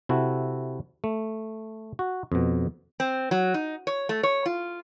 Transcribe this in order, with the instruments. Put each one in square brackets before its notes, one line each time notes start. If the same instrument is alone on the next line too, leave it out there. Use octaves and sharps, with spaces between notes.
[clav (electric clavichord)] C3 E4 F#4 A4
A3
F#4
F2 B2
[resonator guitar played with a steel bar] C4
F#3
D#4
C#5
A3
C#5
F4